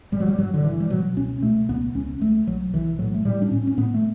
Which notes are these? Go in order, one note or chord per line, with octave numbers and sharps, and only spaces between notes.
G1 G3
F#3
G3
G2 F#3
D3
G1 E3
G3
B2 F#3
C#2 C#4
B2 A3
C#2 B3
C#2 C#4
C#2 A3
B1 F#3
B1 E3
A2 F#3
A3
A2 G3
D4
A2 C#4
C#4
A2 B3
A3